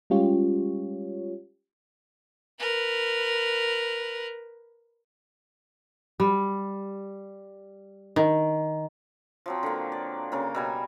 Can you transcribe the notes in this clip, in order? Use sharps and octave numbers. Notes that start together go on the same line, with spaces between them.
G3 G#3 C#4 F4 G4 C#5
A#4 B4
G3
D#3
F3 F#3 C4
D3 A#3
D5
C#3 F#3 A#3
B2 G3 G#5